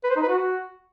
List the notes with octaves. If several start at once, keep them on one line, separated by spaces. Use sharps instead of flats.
B4
C5
D#4
B4
F#4